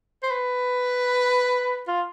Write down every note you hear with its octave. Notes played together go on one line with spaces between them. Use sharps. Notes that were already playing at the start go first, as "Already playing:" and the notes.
C5
B4
F4